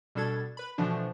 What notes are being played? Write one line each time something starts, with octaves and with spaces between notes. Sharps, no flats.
B2 G3 D4 A4 G#6 A6
B4 B5
B2 D3 E3 F3 A3 D4